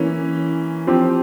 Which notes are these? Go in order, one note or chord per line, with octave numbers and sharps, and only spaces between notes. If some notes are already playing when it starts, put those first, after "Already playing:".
Already playing: E3 A#3 C#4
F3 C4 G4